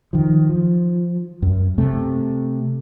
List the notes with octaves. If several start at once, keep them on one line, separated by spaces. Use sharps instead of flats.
D#3 F3
F3
F#2
C3 A3